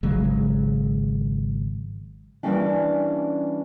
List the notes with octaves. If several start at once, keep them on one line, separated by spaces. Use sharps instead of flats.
G#1 C#3 F#3 G#3
E3 F#3 G3 A#3 C#4 D4